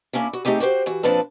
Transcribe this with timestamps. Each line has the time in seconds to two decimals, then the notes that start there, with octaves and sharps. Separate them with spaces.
0.13 A#3 C#4 D4 E4
0.33 F#4
0.45 A3 C4 D#4 G4 G#4
0.60 F#4 G4 B4 C5
0.86 E3 F#4
1.03 A#2 F3 C4 D4 B4 A5